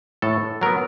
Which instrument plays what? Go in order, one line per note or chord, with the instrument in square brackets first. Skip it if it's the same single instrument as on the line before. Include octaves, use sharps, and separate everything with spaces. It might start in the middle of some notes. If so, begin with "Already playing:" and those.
[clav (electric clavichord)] A2 A4
F#3 B3 A#4